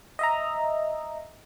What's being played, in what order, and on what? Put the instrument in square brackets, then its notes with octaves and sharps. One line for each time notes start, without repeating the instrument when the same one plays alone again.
[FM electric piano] D#5 E5 A#5